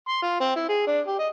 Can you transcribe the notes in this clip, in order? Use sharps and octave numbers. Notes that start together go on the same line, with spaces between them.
C6
F4
C4
E4
G#4
D4
G4
D#5